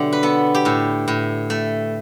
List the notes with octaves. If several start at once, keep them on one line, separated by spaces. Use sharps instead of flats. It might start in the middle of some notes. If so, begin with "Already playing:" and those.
Already playing: B2 D3 F#3 D4 E4 G4
B4
B3 A4
G4
A2 A4
A2
A3